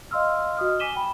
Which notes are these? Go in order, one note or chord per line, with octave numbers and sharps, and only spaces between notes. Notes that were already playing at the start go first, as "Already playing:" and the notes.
D#5 F5 C6 E6 F6
F#4 D#5 D#6 F6
G#5 D6 B6 D#7 E7 G7
G5 B5